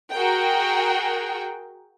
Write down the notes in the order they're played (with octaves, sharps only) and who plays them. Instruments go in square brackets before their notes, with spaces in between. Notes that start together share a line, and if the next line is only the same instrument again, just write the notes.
[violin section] F#4 G#4 A#4 G5